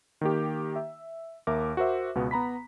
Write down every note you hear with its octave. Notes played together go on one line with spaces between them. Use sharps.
D#3 A#3 G4
E5
D#2 A#4 E5 D6
F#4 A#4 C5 E5
C#2 B2 B3
B3 A#5 B5 B6